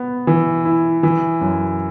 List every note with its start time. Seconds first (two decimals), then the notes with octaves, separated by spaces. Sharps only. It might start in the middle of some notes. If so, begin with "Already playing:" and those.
Already playing: B3
0.27 E3
0.65 E4
1.03 E3
1.41 F#2